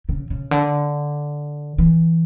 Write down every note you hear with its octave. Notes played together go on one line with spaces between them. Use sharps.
C#3
C#3
D3
E3